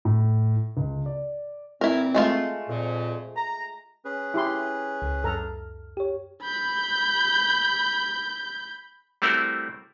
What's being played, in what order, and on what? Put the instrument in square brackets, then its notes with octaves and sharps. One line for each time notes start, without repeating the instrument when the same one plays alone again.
[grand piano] A2
C#2
D5
[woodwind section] A#2 E3 C4 [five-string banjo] E4 A#4
[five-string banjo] G#3 A3 F4
[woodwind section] F2 A#2
A#5
[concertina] C#4 G#4 B4
[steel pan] E4 G4 C6
[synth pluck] C#2
[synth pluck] F#2 F6 [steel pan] A4 A#5
[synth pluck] G4 C#5
[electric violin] B5 G6
[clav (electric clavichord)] G3 A3 C4 E4 F#4 A#4